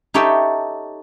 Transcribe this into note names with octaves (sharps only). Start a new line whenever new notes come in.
D#4 G4 A4 C#5 E5 G5